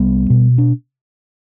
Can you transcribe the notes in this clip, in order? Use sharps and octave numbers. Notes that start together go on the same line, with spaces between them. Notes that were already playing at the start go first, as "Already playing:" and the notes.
Already playing: C2 G3 B3
B2
D4